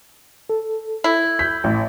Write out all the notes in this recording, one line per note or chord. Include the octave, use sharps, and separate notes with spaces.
A4
E4
G6 B6
A1